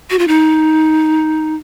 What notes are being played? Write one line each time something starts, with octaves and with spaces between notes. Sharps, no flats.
F#4
F4
D#4